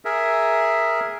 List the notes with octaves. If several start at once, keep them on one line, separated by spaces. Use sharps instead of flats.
G#4 A#4 E5